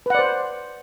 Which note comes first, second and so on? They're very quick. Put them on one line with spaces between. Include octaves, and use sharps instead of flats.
B4 F#5 D5 C5